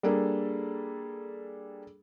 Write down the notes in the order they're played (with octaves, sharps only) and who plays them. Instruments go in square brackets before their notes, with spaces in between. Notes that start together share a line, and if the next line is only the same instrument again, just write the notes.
[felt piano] G3 A#3 D4 G#4 A4